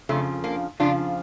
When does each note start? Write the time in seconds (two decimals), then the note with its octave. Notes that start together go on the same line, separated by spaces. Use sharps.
0.09 F2 C#3 F3 A3 C#4
0.44 A#3 D4
0.80 F2 C#3 F3 D4 F4